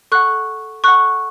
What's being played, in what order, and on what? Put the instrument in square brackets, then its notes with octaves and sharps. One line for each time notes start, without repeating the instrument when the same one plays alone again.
[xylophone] A4 F#5 C#6 F#6
A4 F#5 C#6 F#6